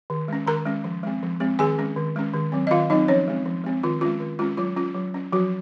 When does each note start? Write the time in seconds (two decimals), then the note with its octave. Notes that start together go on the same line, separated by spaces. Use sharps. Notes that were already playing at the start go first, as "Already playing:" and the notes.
0.10 D#3
0.28 G#3 C#4
0.47 D#3 A#4 A#5
0.66 G#3 C#4
0.84 F3
1.03 G#3 C4
1.23 F3
1.40 G#3 C4
1.59 D#3 G#4 G#5
1.78 G#3 C#4
1.96 D#3
2.16 G#3 C#4
2.33 D#3
2.52 F#3 C4
2.67 D#5
2.71 D#3 F4 F5
2.90 F#3 C4 D#4 D#5
3.08 F3 C#4 C#5
3.28 G#3 C4
3.45 F3
3.64 G#3 C4
3.83 D#3 F4
4.01 G#3 C#4 F4
4.20 D#3
4.39 G#3 C#4 F4
4.57 F#3 F4
4.76 C#4 F4
4.95 F#3
5.14 C#4
5.32 F3 F#3 F#4